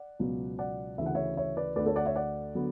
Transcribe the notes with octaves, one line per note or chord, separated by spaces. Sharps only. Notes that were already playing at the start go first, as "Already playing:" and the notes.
Already playing: D5 F#5
C#2 B2 F#3 B3
D5 F#5
D2 C#3 E3 E5
F#5
C#5 E5
C#5 E5
B4 D5
D2 D3 A3 B4 D5
A4 C#5
D5 F#5
C#5 E5
D5 F#5
D3 F#3 B3